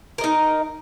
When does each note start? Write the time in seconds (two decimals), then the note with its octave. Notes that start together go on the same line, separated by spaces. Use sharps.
0.18 A#4
0.21 D#5
0.24 D#4